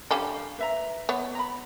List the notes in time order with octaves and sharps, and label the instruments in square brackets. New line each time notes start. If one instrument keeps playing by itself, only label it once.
[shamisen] D3 G3 C#4 [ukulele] F5
[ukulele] B4 E5 A#5
[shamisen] B3 C#5
[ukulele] A#5 B5